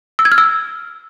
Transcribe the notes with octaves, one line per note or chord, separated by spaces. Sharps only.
E6
G#6
F6
E6